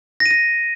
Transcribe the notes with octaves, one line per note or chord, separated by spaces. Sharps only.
A#6
D#7
A#6